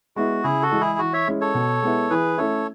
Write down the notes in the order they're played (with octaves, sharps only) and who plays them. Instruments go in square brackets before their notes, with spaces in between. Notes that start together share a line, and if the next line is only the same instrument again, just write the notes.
[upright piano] G#3 B3 E4 [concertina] F#4
[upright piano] C#3 [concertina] E4 G#4
[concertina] F#4 A4
[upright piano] E3 G#3
[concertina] E4 G#4
[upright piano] E3 [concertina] F#4
[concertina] C#5 E5
[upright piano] G#3 C#4 E4
[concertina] A4 C#5
[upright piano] B2
G#3 B3 E4
[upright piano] E3 [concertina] G#4 B4
[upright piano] A3 C#4 E4 [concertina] A4 C#5